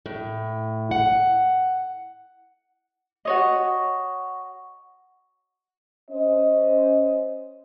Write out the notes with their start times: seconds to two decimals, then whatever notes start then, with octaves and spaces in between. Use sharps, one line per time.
0.06 A2
0.91 F#5
3.25 F#4 C#5 D#5
6.11 C#4 C5 D#5